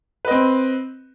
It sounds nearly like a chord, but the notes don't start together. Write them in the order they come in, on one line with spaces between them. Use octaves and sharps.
B4 D#5 C4